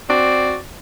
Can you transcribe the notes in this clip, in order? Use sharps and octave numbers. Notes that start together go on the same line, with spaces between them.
C4 F#4 D5